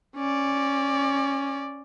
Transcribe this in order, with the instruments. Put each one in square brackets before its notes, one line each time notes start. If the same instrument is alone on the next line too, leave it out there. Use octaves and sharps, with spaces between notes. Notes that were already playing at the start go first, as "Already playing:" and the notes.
[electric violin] C#4 D5